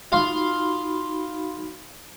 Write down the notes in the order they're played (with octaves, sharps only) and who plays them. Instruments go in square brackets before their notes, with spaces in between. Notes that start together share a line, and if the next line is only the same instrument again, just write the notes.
[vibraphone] D#4 F#4 B5 [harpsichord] F4 F5 C6